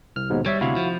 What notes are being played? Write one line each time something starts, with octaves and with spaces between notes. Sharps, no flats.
C2 F6
D#2 G#2 B2
G3 C#5 E5
D2 C3 E4 F#4 F5
F3